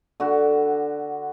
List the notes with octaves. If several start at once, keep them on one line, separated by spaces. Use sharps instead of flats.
D3 F#4